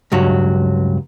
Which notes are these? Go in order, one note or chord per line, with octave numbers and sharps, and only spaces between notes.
C#2 G2 F#3